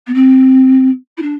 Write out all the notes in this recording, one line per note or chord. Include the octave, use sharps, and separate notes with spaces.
B3
C4
E4
D4